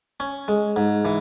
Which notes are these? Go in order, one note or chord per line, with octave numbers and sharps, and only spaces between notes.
C#4
G#3
G#2
E3